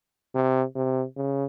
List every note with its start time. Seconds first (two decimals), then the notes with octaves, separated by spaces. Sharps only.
0.35 C3
0.75 C3
1.16 C#3